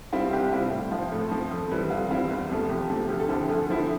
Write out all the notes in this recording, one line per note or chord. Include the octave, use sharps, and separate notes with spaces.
C3 G3 C4 E4 F4
C2 G4
C3 G3 C4 E4 F4
A2
F3 C4 F4
A2 A4
F3 C4
F2
E3 G3 C4 E4
F2 F4
E3 G3 C4 E4 F4
E2
C3 F3 A3
E2 G4
C3 F3 A3
D2 G4
A4
D3 F3 C4 E4 G4
D2 A4
D3 F3 C4 E4